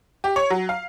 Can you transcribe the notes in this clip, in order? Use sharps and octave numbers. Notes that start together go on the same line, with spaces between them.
G4
C#5
F#3
F5